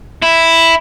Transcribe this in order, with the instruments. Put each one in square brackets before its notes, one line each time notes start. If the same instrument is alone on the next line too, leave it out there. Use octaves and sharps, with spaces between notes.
[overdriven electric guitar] E4